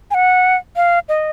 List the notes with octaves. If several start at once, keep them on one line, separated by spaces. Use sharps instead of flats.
G#5
F#5
F5
D#5